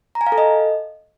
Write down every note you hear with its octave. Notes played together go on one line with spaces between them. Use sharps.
A#5
G#5
F5
A4
D#5